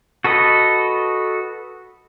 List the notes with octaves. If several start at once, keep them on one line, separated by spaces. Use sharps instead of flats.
F#4 A4 B4 D#5